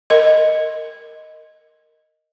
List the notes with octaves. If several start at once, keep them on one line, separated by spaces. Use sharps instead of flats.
A#4 D#5